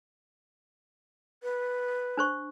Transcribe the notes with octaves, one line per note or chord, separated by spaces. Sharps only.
B4
D4 C5 C#6